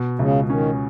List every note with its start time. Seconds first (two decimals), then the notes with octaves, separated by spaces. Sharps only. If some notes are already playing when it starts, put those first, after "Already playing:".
Already playing: B2
0.19 C#2 C#3
0.49 D#3 C#4